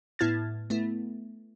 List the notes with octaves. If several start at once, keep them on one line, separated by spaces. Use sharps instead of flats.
A2 B3 E4 F6 G#6 A6
A3 B3 E4